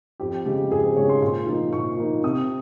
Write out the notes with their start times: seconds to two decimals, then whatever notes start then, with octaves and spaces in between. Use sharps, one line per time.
0.20 F2 G4
0.45 C#3 G#3 G4
0.71 F2 G#4
0.84 C5
0.96 C#3 G#3 C#5
1.09 C6
1.22 A#2 C6
1.47 F3 A#3 D#4
1.73 A#2 C#6
1.98 F3 A#3 D#4
2.23 C3 D#6